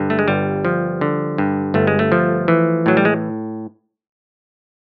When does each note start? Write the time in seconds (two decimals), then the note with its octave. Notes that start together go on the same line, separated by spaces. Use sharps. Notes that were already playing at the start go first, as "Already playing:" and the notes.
Already playing: G2 D3
0.10 A3
0.19 G#3
0.28 G1 G3
0.65 F3
1.01 D3
1.38 G2
1.74 G1 A3
1.87 G#3
1.99 A3
2.12 F3
2.48 E3
2.86 A2 F#3
2.97 G3
3.05 G#3